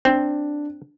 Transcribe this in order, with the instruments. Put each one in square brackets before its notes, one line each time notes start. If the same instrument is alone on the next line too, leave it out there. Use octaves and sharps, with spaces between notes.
[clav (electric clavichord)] C4 [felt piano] D4